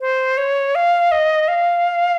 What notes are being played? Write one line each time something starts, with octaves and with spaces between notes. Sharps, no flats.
C5
C#5
F5
D#5
F5